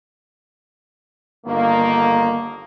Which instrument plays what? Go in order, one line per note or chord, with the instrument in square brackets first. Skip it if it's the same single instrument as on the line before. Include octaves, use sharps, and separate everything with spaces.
[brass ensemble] G1 D3 D#3 A#3